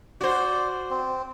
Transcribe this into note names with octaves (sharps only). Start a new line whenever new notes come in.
F#4 C5 D5
C4